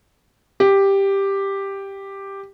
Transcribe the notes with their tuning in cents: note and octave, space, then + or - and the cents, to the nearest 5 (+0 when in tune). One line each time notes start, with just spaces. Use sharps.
G4 +5